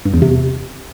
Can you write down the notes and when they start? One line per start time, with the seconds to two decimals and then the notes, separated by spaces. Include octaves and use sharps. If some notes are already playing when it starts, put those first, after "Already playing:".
0.05 G2
0.14 E2
0.22 C3